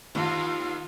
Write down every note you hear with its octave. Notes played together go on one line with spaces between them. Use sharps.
D#2 F4